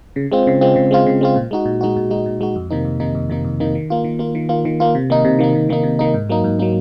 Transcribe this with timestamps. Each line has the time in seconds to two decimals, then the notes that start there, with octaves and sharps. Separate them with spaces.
0.16 C#3
0.32 G#3 C4 F4
0.47 C#3
0.61 G#3 C4 F4
0.76 C#3
0.91 G#3 C4 F4
1.06 C#3
1.21 G#3 C4 F4
1.36 A#2
1.51 G#3 D#4 F#4
1.65 A#2
1.81 G#3 D#4 F#4
1.96 A#2
2.10 G#3 D#4 F#4
2.26 A#2
2.41 G#3 D#4 F#4
2.56 F2
2.70 C3 D#3 A#3 D#4
2.85 F2
3.00 C3 D#3 A#3 D#4
3.15 F2
3.30 C3 D#3 A#3 D#4
3.45 F2
3.60 C3 D#3 A#3 D#4
3.75 D#3
3.90 A#3 F4
4.04 D#3
4.19 A#3 F4
4.35 D#3
4.49 A#3 F4
4.65 D#3
4.80 A#3 F4
4.95 C3
5.10 D#3 A#3 D#4
5.25 C3
5.39 D#3 A#3 D#4
5.55 C3
5.69 D#3 A#3 D#4
5.83 C3
5.99 D#3 A#3 D#4
6.14 G#2
6.29 F#3 A#3 D#4
6.44 G#2
6.59 F#3 A#3 D#4